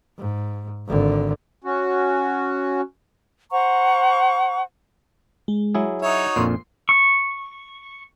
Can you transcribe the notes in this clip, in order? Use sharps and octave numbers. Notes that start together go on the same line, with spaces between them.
G#2
G#1 D3
C#4 F#4
C5 F#5 A#5 C#6
G#3
F#3 E4 G#4
D#4 F#4 C#5 E5 C#6
A#1 F2 A#2 C6
C#6